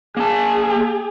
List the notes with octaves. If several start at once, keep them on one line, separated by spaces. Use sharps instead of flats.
A#3 G#4 A5